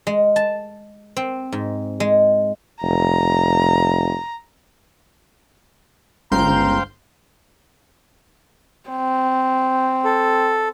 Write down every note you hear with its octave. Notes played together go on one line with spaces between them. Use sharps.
G#3
A5
C4
G#2
G#3
F1 A#5
G1 C#2 C5 F5 G5 A#5 C6 G6
C4
A4